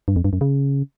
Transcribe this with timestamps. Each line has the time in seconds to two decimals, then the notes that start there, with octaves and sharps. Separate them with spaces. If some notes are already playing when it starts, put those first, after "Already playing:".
0.08 G2
0.16 F2
0.24 G2
0.33 F#2
0.41 C#3